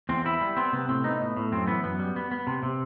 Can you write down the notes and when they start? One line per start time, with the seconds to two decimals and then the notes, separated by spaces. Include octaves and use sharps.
0.09 E2 C4
0.25 B3 E4
0.41 G3
0.57 B3 C4
0.73 C3 B3
0.89 A2 C4
1.04 B3 D#4
1.21 A2
1.37 A2
1.52 F#2 C4
1.67 E3 B3
1.84 F#2 B3
1.99 G3
2.16 B3
2.31 B3
2.47 C3
2.63 C3